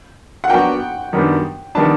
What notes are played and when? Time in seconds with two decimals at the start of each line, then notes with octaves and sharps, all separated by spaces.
0.44 F#5
0.50 F#3 B3 D4 F#4 A#4 G5
1.13 F#2 D#3 G3 B3 D4
1.75 D#3 G3 B3 D4 A5